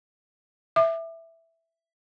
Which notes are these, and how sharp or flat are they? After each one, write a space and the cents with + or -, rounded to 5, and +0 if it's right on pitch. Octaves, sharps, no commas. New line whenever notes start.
E5 +0 D6 +35